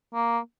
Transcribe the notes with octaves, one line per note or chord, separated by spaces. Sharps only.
A#3